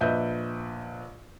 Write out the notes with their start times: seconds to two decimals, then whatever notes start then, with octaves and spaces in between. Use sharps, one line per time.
0.01 A#1 B4 D#5 E5 G6